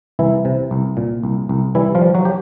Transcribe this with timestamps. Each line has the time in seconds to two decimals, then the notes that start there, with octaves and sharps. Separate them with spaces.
0.19 C2 E3 E4
0.45 C3
0.71 C2
0.97 A#2
1.23 C2
1.49 C2
1.75 E3 G3 E4
1.95 F3 F4
2.01 G3
2.14 F#3 F#4
2.25 G4